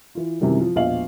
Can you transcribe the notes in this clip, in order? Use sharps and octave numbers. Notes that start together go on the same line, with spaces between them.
E3 F4
F#2 C3 D#3 E3 G3
F3
E1 A#1 D#5 F5 F#7